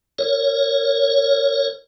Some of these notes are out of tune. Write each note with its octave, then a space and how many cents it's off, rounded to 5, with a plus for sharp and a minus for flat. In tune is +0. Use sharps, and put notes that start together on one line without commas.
A#4 -15 C#5 +0